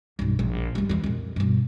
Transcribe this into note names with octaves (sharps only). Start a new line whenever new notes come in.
B1 G2
A#1
C#2 G2
F2 E3
F2 A#2
G2 B2